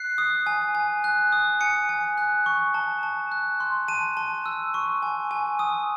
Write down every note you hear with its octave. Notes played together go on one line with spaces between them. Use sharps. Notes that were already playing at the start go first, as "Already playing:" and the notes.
Already playing: F#6 C7
D#6
G#5
G#5
F#6
D#6
G#5 C#7
G#5
F#6
C#6
A5
A5
F#6
C6
A5 D#7
A5
E6
C#6
G#5
G#5
D#6